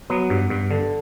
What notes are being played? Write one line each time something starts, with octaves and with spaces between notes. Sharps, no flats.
F#3 B3
G2
G2
D3